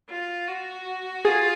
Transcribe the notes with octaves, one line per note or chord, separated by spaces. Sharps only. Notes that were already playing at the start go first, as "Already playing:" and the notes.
F4
F#4
F4 G#4